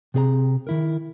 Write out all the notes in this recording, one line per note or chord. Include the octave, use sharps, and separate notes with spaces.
C3 C4 G#4 C#5 A#5
D#3 E4 A#4